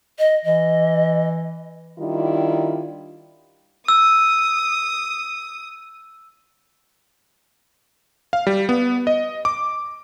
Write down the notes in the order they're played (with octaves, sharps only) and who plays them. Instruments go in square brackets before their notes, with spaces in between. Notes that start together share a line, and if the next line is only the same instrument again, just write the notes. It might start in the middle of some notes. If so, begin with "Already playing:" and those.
[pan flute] D#5
[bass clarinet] E3 [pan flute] D#5
[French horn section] D#3 G3 D4 E4 F4
[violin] D#6 [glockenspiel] E6
[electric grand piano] F5
G3
B3
D#5
D6